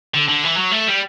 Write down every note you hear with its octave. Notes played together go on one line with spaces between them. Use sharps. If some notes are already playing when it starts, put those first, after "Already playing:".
D3
D3
E3
F#3
A3
G3